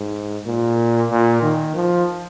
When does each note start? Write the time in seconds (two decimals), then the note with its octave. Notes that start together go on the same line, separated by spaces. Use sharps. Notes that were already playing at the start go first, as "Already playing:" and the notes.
Already playing: G#2
0.46 A#2
1.11 A#2
1.42 D#3
1.75 F3